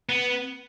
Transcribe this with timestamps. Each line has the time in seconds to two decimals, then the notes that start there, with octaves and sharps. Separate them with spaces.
0.09 B3